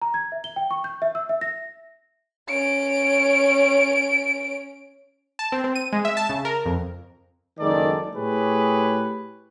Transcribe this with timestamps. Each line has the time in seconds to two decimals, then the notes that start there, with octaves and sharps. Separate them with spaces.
0.02 A#5
0.14 G#6
0.32 E5
0.44 G7
0.56 G5
0.71 C#6
0.84 G6
1.02 E5
1.15 E6
1.29 E5
1.41 A#6
2.50 C#4 D7
5.39 A5
5.52 C4
5.64 C4
5.75 D#7
5.93 G#3
6.05 E5
6.17 A5
6.29 C#3
6.45 A#4
6.66 F2
7.60 F#1 D#3 G#3 A4 D5
8.15 A2 G4 G#4 B4 C#5